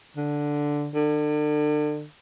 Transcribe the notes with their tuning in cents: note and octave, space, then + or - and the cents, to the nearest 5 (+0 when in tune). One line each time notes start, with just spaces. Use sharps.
D3 +0
D3 +35